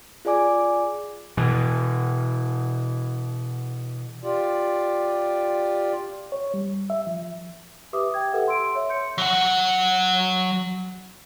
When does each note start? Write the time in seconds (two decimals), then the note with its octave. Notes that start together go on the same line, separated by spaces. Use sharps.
0.25 F4 G#4 D5 G#5 D6
1.37 B2 E3
4.24 F4 G4 D5
6.32 C#5
6.54 G3
6.90 E5
7.07 F3
7.93 G4 B4 E5 D6 D#6
8.14 G5 G#6
8.33 G4 A4 B4 E5 F#5
8.48 C6 E6 D7
8.75 C#5 E5
8.89 C6 G6 C#7
9.18 F#3 F#5